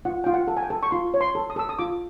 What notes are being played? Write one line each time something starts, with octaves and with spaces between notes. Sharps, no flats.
F4 F#5
F4 G5
F#5
A4
G#5
G5
A4
C#6
F4 C6
C#5
C6
A4
D#6
A4 E6
D#6
F4 D6